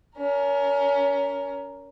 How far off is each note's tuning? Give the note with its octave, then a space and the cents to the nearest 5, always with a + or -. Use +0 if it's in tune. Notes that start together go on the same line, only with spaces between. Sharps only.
C#4 +30 A#4 +0